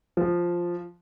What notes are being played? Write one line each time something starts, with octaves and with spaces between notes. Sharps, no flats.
F3